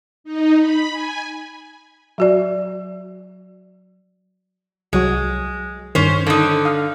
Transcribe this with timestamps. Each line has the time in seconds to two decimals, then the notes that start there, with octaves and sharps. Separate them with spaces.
0.24 D#4
0.57 B5
0.92 G#5
2.18 F#3 F#4 D5
4.93 C2 F#3 G#3 F#4
5.95 G2 D#3 C#4 C5
6.27 D3 D#4
6.65 F5 D#6 F6